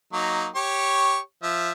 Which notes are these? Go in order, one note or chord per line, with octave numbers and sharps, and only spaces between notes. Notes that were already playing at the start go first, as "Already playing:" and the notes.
F#3 A#3 D#4
G4 C#5 C#6
F3 E5